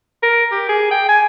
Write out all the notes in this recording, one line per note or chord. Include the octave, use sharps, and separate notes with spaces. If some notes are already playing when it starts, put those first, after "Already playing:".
A#4
G4
G#4
G5
G#5